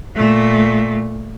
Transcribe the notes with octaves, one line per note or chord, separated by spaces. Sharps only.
A#2 A3